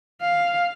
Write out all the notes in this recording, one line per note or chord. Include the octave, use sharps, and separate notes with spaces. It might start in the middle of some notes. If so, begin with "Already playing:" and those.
F5